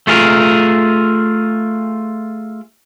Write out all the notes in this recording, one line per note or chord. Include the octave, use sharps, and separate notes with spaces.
A3 F4 G#4 A#4